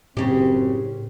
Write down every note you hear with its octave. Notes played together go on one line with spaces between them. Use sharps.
F#1 A2 C#3 C4 G4